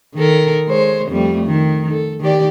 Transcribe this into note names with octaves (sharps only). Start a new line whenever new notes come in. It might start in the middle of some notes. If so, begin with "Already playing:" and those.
D#3 A4 A#4
G#3 C5 C#5
F2 G3 A3
D#3
A4
D#3 G4 D5